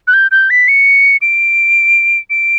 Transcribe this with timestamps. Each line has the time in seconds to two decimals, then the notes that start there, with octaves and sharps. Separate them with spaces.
0.07 F#6
0.13 G6
0.31 G6
0.50 B6
0.68 C#7
1.22 D7
2.30 D7